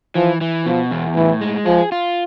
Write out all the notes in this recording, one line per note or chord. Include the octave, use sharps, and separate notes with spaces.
E3 F3
E3
B2 F3
E2
A2 E3
G#3
F3 G#4
F4